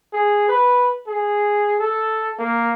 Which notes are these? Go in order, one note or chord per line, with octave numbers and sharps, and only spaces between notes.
G#4
B4
G#4
A4
A#3